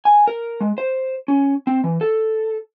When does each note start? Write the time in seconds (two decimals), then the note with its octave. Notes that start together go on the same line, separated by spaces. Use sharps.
0.05 G#5
0.28 A#4
0.61 G#3
0.78 C5
1.28 C#4
1.67 C4
1.84 E3
2.01 A4